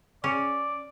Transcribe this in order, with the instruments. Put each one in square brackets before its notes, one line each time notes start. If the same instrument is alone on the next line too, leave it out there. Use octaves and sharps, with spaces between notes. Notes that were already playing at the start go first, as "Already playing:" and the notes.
[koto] C#4 [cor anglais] D5